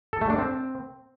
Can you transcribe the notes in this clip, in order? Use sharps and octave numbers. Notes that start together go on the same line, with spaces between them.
A4
A3
D4
C4